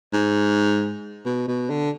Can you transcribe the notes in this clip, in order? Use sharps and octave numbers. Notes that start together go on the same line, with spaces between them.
G#2
B2
B2
D3